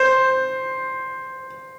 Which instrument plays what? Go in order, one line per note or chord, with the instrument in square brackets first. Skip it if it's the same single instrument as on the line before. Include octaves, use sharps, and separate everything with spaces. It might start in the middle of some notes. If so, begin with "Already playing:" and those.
Already playing: [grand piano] C5